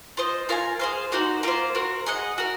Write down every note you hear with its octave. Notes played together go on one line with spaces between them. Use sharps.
F4 C5 D#5
F4 A#4 F5 G#5
G#4 C5 F5
A#3 D#4 F#4 C5
A#3 F4 C5
C4 F#4 A#4
G#4 D#5 F#5
F#4 A#4